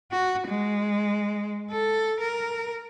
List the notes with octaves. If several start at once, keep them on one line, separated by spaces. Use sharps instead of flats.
F#4
G#3
A4
A#4